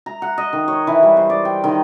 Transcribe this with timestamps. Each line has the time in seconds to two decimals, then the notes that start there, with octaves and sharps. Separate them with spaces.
0.06 A#5
0.22 F#5
0.38 D#5
0.53 D#3
0.68 C#5
0.87 E3
1.03 G3
1.17 C5
1.30 D5
1.45 G5
1.64 D#3